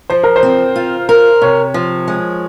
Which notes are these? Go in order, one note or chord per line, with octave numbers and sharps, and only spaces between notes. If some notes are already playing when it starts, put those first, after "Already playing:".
F3 C5
A#4
C5
C4
F4
A#4
C3 C#5
F3
G#3